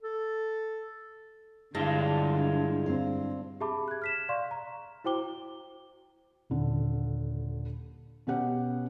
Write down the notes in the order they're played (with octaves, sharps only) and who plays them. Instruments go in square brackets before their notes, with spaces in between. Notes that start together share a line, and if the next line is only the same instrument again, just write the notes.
[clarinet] A4
[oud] G2 [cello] D3 [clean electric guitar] G#3 E4 F4
[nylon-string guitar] C4 F5
[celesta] G4 G#4 E5 A5 B5 D6
F#6 G#6
F6 B6 E7
D5 F5 C6 C#6
A#5
E4 F#4 C5 G5 D6 G7
[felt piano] D#1 D3
B2 B3 C#4 G4 F#5